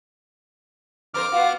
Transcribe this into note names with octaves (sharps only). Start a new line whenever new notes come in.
F2 A#4 C5 D6 F6
B3 F4 F#4 F5